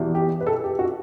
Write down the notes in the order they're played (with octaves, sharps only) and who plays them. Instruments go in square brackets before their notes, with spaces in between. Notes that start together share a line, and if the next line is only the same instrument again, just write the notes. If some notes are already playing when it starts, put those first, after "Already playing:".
Already playing: [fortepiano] E2 B2 G3
[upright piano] G4
B4
A4
G4
F#4